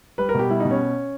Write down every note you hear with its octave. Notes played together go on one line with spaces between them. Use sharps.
G3 B4
A#4
B2 G4
G3 E4
B2 D#4
C#4